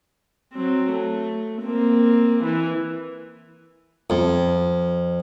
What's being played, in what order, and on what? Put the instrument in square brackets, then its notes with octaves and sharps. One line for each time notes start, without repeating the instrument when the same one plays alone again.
[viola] F#3 C4
A3
A#3 C4
E3
[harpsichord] F2